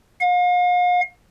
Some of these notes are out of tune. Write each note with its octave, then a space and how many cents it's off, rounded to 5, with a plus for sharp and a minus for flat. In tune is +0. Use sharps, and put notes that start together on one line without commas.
F5 +40